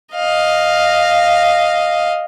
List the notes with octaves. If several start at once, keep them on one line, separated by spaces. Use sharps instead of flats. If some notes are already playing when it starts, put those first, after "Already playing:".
D#5 F5